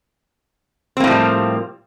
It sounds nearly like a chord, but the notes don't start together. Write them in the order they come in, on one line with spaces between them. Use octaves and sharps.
C4 A#3 A2 F3 G3